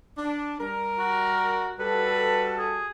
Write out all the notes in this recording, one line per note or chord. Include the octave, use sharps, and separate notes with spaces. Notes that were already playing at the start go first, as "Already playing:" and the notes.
D4
G3 A#4
F#4
G3 F#4 A4 B4
G#4